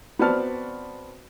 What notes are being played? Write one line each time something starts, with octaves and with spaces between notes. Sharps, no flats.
B3 C4 F#4 D5 A5 F6